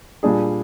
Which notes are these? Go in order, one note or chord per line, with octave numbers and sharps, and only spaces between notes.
A#2 G3 D4 G#4